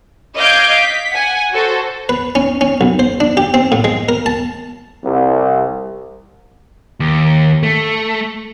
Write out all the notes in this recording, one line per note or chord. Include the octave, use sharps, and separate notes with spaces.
D#5 F5 D6 G6 G#6 D7
B6
F#5 G#5
F#4 A4 C5
B4
C#4
C#4
B1
C5
D4
G4
C4
A2
G#3
A#4
A5
C2
D#2
A3